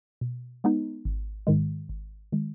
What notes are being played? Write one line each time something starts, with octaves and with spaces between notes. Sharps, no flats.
B2
G#3 B3 D#4
G#1
G#2 D#3 G#3
G#1
D#3 G#3